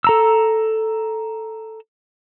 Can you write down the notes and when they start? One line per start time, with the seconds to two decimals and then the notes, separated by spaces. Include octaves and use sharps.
0.04 A4 A#5 E6